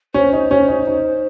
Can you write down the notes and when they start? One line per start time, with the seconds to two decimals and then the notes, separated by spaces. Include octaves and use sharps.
0.14 C#4 C5
0.33 D#4
0.51 C#4
0.68 D#4
0.87 D#4